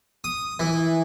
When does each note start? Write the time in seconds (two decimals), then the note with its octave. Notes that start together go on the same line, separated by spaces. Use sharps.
0.24 D#6
0.60 E3